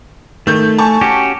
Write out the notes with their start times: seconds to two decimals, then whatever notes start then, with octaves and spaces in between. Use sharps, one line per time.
0.47 D#3 A3 G6
0.78 G#5 A5 C#6
1.01 C#4 F#4 G4